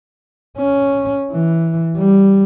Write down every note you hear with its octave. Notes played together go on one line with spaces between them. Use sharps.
C#4
E3
G3